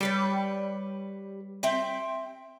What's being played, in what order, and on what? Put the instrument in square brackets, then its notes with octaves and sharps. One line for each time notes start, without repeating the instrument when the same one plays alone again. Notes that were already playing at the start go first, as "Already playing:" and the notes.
[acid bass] G3 [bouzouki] G4 B4 C#5
[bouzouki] C4 E5 G5